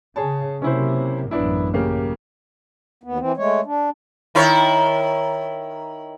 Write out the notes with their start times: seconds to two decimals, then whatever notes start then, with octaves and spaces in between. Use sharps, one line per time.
0.16 C#3 G#4 C#5 A5
0.62 C3 F#3 A#3 C#4 E4 C5
1.31 A1 F#2 B3 D4 E4
1.74 C#3 A#3 G4
3.04 D#2 B3
3.19 E3 C4
3.37 G#3 A3 C#5
3.65 D4
4.35 D#3 E4 C#5